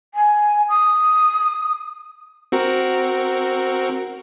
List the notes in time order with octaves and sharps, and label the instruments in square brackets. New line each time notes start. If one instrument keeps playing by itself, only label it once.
[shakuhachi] G#5
D#6
[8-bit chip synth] C4 F#4 A#4